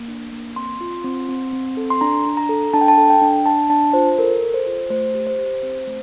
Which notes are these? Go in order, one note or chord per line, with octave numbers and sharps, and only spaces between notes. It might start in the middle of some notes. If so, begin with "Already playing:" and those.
Already playing: A#3
D4
A#3
C4 C6
F4
C4
C4
C4
A4
C6
D4 A#5
D4
A#5
A4
D4 A5
G5
A5
A4
G5
D4
D4 A5
D4 A5
F4 C5
A4 A#4
A4
C5
F4
A3 C5
G4
C5
G4
C4
A3